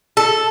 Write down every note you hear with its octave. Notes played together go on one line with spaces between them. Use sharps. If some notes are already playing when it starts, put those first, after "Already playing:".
A4